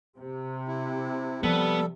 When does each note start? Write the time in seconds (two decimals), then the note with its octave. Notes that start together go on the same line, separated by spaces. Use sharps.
0.19 C3
0.67 E4
1.43 F3 G3 B3 A4